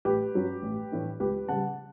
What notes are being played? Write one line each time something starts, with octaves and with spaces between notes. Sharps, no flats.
A1 G4 B4
G2 F#3 C#4
A1
A2 E3 A3 D4
C#2 G4 B4
C#3 G3 F#5 A5